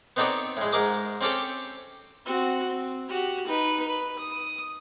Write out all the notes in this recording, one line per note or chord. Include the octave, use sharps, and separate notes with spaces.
B3 C4 D#4 A4 C#5 D5
A2 G#3
G#2 G#3 A#4 D6 D#6
C4 C#4 G4 A4 G5
C4 F#4
C4
F#4 G4
D#4 B4
B4
D#6